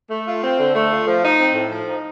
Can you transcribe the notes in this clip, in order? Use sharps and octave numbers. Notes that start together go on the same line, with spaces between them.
A3
F4
C4
D3
A3
F4
F3
D#4
C4
A2
F3
D#4